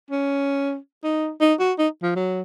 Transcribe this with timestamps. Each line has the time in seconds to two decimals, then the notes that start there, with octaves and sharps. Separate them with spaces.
0.11 C#4
1.04 D#4
1.41 D#4
1.59 F#4
1.79 D#4
2.03 F3
2.16 F#3